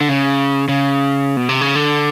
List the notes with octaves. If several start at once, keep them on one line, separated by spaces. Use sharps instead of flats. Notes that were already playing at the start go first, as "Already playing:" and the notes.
D3
C#3
C#3
B2
C3
C#3
D3